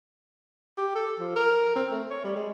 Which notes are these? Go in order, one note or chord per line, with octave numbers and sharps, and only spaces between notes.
G4
A4
F3
A#4
C4
A3
C#5
G3
G#3